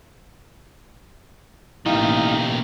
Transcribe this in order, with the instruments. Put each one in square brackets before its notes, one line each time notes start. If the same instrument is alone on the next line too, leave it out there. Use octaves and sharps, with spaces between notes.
[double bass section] A1 A#3 [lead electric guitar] B2 G4 [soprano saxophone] D#4 [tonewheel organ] E4 F5